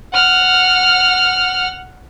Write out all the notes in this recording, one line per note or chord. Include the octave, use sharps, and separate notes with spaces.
F#5 F6